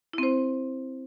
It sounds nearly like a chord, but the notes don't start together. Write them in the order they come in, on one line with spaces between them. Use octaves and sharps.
E4 C4 C5